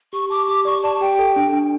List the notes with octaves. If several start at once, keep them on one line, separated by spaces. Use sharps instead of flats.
G4 C#6
A5 D6
G4 D6
D5 C#6
D5 A5
G4 G5
A4
D4
D4